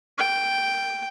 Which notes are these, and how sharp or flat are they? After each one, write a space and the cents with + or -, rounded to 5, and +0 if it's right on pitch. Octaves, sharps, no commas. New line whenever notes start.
G5 +0